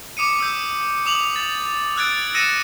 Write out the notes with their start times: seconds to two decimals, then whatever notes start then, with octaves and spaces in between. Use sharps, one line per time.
0.17 D6 D#6 C#7 D#7
0.40 E6 G6
1.06 D6 D#6 F7 F#7
1.36 A6
1.97 E6 F#6 G#6 A6 D7
2.34 E6 A#6 C#7 D#7 E7